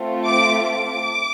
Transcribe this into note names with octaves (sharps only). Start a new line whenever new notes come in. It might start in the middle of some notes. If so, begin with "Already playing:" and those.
Already playing: A3 C4 F4
D6
D6